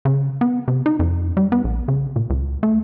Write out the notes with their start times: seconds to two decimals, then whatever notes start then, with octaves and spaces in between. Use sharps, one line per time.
0.05 C#3
0.41 B3
0.68 C3
0.86 D#4
0.99 F2
1.37 G3
1.52 B3
1.64 A#1
1.88 C#3
2.16 A#2
2.30 C#2
2.63 A3